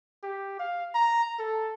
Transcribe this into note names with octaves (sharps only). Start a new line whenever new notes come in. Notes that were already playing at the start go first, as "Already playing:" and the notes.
G4
F5
A#5
A4